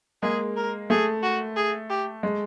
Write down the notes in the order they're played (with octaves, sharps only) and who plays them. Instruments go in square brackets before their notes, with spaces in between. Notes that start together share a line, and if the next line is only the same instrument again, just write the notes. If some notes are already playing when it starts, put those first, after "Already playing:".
[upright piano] G#3 A#3 [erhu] G#4
[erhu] A#4
[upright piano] A3 [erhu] G#4
[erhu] F#4
G#4
G4
[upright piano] G#3